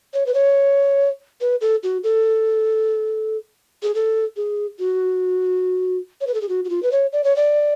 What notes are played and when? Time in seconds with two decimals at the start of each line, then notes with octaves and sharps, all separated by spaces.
0.14 C#5
0.26 B4
0.34 C#5
1.41 B4
1.61 A4
1.83 F#4
2.04 A4
3.83 G#4
3.95 A4
4.37 G#4
4.79 F#4
6.21 C#5
6.27 B4
6.34 A4
6.42 G#4
6.49 F#4
6.65 F#4
6.69 F4
6.83 B4
6.92 C#5
7.13 D5
7.24 C#5
7.36 D5